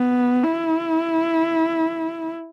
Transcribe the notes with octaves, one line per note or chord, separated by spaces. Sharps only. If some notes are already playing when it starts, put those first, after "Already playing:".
Already playing: B3
E4